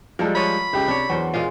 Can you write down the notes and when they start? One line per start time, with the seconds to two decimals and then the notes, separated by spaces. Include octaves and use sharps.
0.19 F3 G3 G#3 A4 A#4
0.35 F4 C#5 D#5 B5
0.73 C#2 G4
0.88 C3 D4 C#5
1.09 E2 F#3 C5
1.34 A#2 G#3 F4